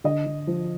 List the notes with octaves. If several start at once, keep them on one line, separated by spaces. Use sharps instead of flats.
D3 D#5
D3
F3